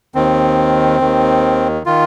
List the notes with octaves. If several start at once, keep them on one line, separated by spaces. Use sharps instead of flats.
D#2 D#3 C4
D#2 D#3
D#3 F4